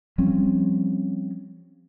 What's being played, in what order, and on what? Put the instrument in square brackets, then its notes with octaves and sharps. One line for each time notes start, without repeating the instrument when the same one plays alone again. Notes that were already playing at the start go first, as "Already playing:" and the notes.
[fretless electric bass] F3 G3 C4 C#4